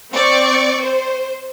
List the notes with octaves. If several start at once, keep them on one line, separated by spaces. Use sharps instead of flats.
C4 D5 C#6
C5